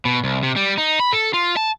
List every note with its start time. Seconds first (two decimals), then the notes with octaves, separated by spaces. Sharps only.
0.05 B2
0.24 C2
0.43 C3
0.56 G3
0.78 D#4
1.00 B5
1.13 A4
1.34 F4
1.57 A5